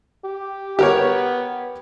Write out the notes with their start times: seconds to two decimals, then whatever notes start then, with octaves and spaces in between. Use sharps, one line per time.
0.24 G4
0.79 B3 G4 A#4 C#5